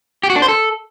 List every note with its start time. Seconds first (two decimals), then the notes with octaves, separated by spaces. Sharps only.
0.23 G4
0.30 F#4
0.36 D4
0.42 C5
0.48 A4